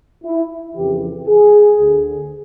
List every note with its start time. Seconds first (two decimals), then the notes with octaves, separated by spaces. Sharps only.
0.24 E4
0.76 F2 C#3 E3 G4
1.28 G#4
1.79 D2 D3